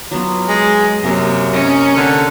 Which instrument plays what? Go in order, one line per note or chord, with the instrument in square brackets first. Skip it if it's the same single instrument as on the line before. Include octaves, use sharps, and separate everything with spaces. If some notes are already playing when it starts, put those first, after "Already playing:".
[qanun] F#3 B3 F4
[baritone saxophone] G#3
[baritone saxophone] F#2 [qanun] C3 A#3 G#4
[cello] C#4 [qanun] A#4 D#5
[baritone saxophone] D3